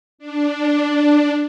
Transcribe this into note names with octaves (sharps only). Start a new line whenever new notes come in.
D4